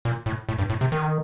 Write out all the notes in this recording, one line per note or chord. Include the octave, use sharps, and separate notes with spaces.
A#2
A2
A2
G2
A2
C3
D#3